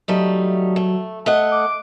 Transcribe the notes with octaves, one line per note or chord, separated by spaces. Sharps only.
F#3 G3 A3 D#4
A3
A3 D#5 F#5
D6